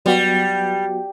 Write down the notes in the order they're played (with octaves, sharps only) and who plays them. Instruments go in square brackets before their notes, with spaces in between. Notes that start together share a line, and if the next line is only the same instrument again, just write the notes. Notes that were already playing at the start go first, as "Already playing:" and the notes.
[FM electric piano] F#3 B3 F#4 [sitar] G3